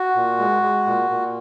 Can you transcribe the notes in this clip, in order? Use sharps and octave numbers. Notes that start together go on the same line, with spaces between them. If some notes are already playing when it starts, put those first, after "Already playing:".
Already playing: F#4
A#2
G#3
G#3
A#2
A#2